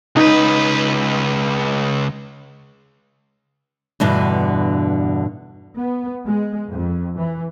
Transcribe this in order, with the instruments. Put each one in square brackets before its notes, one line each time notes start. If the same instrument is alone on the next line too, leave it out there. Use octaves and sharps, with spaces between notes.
[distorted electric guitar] C#2 B4 [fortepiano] D#4
[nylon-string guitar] E2 G2 B2 D3
[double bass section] B3
G#3
F2
E3